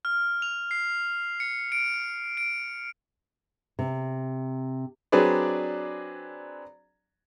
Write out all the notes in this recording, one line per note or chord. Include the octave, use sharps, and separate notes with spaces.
F6
F7
C7
C#7
D7
D7
C3
F#3 C4 D4 G#4 B4 D5